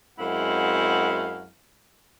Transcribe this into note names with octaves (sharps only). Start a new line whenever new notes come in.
F#2 G#3 C4 E4 F5 F#5